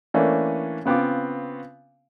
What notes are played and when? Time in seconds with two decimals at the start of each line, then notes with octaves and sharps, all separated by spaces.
0.14 E3 A3 A#3 C#4 D4
0.86 C#3 B3 C4 F4 D6